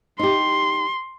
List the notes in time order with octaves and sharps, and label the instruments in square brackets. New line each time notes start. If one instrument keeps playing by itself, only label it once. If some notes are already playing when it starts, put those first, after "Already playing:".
[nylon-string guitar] D#4 G4 [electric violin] C6